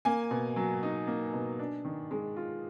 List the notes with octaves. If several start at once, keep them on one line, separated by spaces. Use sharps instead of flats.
A#3 G#5
B2
F#3
D#4
A#3
B2
D4
D#3
G#3
F4